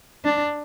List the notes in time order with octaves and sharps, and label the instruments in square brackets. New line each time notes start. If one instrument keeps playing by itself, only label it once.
[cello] D4